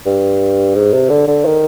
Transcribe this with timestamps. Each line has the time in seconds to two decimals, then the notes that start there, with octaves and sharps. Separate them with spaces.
0.06 G2
0.75 G#2
0.93 C3
1.10 D3
1.27 D3
1.45 D#3